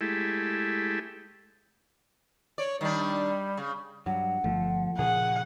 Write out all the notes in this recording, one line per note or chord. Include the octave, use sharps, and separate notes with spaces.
G#3 A3 E4 G4
C#5 D5
D#3 G3 D4
C#3
G2 F#3 F#5
G1 F3 A3
A#2 C#3 F3 G#4 F#5